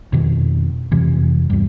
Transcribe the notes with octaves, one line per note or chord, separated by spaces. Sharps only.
F2 B2 D#3
F2 C3 E3
E2 G2